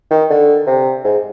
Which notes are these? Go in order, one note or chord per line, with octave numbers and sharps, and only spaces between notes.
D#3
D3
C3
G#2